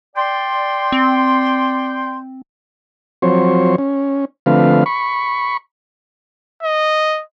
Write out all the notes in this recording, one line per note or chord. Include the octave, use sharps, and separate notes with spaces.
D5 G5 C6
C4
F3 F#3 C4 C5 C#5
C#4
D3 F3 A3 C4 B4 F5
B5 C#6
D#5